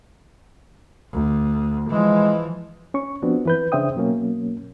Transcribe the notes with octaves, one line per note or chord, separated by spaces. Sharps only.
D2
E3 F3 G#3
C#4 C#6
F3 B3 C4 D4 F#4
E3 B4 G6
C#3 D4 C5 E5 G5 D#6
B2 F#3 A#3 C#4